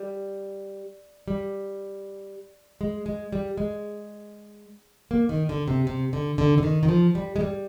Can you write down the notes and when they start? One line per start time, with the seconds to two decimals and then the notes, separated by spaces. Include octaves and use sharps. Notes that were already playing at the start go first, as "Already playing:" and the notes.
Already playing: G3
1.28 G3
2.81 G#3
3.06 G#3
3.33 G3
3.57 G#3
5.11 A#3
5.29 D#3
5.49 D3
5.68 C3
5.87 C3
6.13 D3
6.38 D3
6.58 D3
6.63 D#3
6.83 D#3
6.88 F3
7.15 G3
7.36 G#3
7.41 G3